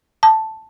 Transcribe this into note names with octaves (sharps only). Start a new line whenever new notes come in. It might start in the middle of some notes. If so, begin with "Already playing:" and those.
A5